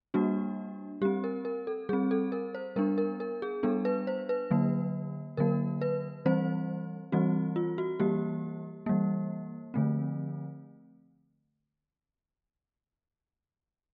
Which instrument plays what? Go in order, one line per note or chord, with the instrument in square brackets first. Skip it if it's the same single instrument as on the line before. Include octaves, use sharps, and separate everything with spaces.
[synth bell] G3 A#3 D4 F#4
G3 G4
C4
A#4
A#4
A4
G3 G#4
C4
A4
A#4
C5
G3 B3 D4 A#4
A#4
A#4
G#4
G3 B3 D4 A4
B4
C5
B4
D3 F#3 A#3
D3 F#3 A#3 A#4
B4
E3 G3 C4 C5
E3 G3 C4 F#4
F4
F#4
E3 G3 A#3 G4
E3 G3 A#3
D3 F3 A3 C4